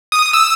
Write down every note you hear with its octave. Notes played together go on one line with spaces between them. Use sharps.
D#6
E6